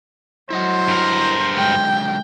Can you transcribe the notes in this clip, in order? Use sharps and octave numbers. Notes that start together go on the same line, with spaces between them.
F#3 E4 C5 D#5 F#5
G2 A#4
D3 F#3 G#3 G5